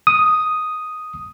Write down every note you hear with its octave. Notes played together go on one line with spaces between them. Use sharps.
D#6